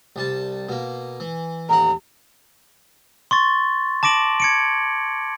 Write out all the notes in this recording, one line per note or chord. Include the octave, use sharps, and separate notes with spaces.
C2 G3 A5
B2 A#3
E3
A1 D#2 F#5 A#5
C6 C#6 A6
A5 D6 A#6 D7 F#7
G#6 C#7 D7